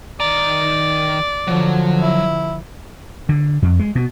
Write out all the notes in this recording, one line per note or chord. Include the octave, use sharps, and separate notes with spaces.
D#3 D5 A#5
D3 F3 F#3
E4
D3
F2
G#3
B2